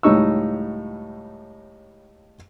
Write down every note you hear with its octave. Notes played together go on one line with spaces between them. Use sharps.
C#2 A2 G3 D#4 C#6 E6